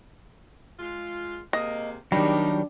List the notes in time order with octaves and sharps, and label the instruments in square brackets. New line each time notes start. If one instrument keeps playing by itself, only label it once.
[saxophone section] G#3 F4
[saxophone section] C3 G#3 A#3 [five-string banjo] D#5
[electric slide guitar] D#3 F#3 [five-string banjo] G3 [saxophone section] A#3 D#4 G4 [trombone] D4